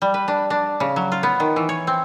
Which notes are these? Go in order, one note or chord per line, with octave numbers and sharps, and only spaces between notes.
G3
B4
D4
D4
C#3
F#3
F4
B3
D#3
E3
C#5
C4